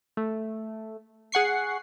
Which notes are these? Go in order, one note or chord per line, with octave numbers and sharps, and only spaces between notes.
A3
G#4 F#5 C#6 C7